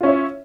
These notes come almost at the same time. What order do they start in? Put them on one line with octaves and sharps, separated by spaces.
F4 C#4 E5 C#5